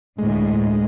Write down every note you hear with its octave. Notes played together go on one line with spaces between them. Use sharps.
D2 A2 G#3